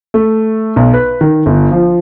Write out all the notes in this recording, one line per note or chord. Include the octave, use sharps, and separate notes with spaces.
A3
B1
B4
D#3
G1
F3